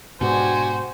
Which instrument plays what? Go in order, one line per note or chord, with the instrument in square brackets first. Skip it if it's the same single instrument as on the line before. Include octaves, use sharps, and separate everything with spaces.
[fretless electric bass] G#2 B2 [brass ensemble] D4 G4 G#5 [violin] F#4 [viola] C5